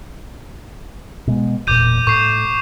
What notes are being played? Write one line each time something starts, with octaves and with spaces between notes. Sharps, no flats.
B2 G#3
E1 A#2 D6 G6 D#7
A2 C#6 C7